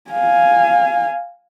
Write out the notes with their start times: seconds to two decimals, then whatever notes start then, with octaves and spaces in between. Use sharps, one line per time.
0.11 F5 G#5